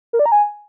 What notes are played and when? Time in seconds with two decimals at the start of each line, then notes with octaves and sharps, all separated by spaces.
0.13 A#4
0.19 D5
0.26 A#5
0.32 G#5